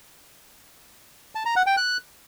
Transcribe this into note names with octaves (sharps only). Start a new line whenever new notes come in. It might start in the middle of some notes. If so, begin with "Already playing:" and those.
A5
A#5
F#5
G5
F#6